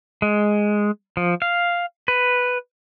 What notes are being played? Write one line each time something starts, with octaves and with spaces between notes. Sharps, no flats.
G#3
F3
F5
B4